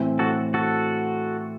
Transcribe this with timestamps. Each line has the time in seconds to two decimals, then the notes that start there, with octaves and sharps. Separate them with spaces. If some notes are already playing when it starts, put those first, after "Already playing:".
Already playing: A2 E3 C4 E4
0.19 F#4 A4
0.54 F#4 A4